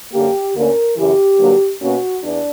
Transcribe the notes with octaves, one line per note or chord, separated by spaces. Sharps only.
F#2 D3 A#3 G4
D2 D3 A#3 C#4 A#4
F#2 C#3 E3 G4
G2 D3 F#3 A#3
B2 A#3 C#4 F#4
E2 D4